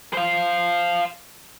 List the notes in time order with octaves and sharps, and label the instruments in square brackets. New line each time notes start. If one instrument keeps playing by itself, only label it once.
[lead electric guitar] C5 F5